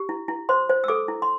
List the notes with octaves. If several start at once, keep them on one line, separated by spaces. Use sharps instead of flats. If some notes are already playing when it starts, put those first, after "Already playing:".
Already playing: G4
E4
E4
C5 C6
C5
E6
A4 D6
E4
C6